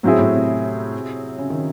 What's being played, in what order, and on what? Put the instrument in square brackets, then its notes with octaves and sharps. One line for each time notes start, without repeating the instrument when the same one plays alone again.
[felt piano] A2 [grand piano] F#3 C4 E4 G#4
[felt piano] A2
C3
C#3
D#3